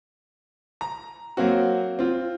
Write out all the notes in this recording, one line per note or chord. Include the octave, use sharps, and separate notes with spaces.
A#5
F#3 A#3 C4 F#4
C4 F4